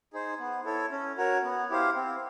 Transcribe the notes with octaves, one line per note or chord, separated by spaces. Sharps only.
D#4 G#4 C5
B3
E4 A4 C#5
C#4
F#4 A#4 C#5
B3
E4 G4 C5 F5
C4